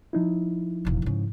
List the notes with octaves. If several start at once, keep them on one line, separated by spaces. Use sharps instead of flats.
F3 D#4 E4
E1 A1
G#2 C#3